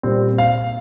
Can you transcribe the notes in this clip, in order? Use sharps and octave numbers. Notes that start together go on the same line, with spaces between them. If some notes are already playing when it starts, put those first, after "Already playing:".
A#2 G3 C4
F5